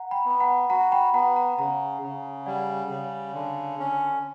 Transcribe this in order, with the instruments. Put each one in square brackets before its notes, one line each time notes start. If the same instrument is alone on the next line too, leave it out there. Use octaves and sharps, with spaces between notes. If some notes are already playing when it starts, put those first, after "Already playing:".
Already playing: [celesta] F#5 A#5
G5 B5
[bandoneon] B3
[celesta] B5
F#5 A#5
[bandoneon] F#4 [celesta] F#5 A#5
[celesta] G5 B5
[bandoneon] B3 [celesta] F#5 A#5
[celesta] F#5 A#5
[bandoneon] C#3 [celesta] F#5 A#5
[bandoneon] C#3
[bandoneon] G3 [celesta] D5 F#5
[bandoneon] C#3
D3
C#4